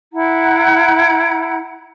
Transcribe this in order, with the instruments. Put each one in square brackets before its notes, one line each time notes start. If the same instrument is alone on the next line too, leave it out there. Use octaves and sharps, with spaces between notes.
[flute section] E4 F#5 A#5